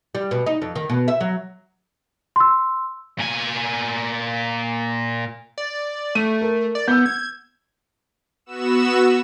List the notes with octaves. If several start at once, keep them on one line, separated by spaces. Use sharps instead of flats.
G3
B2
D#4
F2
D#3
B2
E5
F#3
C6 E6
A#2 G#5
D5
A3 D#7
A#4
D5
B3 E6 G6
G#6
B3 F#4 E6 E7